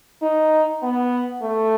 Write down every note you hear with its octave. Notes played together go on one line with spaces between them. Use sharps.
D#4
B3
A3